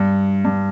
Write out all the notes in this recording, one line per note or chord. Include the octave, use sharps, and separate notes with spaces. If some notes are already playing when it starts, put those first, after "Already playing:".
Already playing: G2
G2